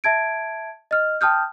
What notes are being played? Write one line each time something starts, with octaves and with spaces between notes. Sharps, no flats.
E5 A5 G#6 D7
D#5 F6
G5 A5 D#6 F6 G6